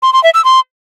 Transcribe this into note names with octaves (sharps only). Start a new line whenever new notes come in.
C6
C6
E5
E6
C6